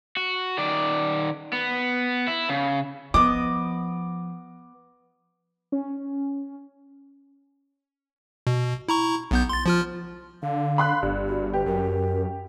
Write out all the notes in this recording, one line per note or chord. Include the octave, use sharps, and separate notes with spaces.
F#4
D#3 D5
B3
E4
C#3
F3 B3 D#5 D6
C#4
B2
E4 A#5 C#6
B1 B3 G6
C6 A6
F3 F4 F6
D3 F5
B5 C6 F#6
G1 G2
F#4
G4 B4
F#2 A#4